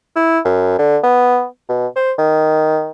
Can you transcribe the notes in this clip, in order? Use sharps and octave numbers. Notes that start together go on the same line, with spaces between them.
E4
F#2
D3
B3
B2
C5
D#3